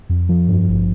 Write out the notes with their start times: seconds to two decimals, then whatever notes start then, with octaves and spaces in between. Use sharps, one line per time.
0.09 F2
0.29 F3
0.48 G2
0.68 G#1